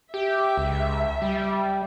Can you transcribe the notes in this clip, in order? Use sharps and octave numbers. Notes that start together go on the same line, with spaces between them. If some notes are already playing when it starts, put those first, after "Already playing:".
G4 E5
C#2
G3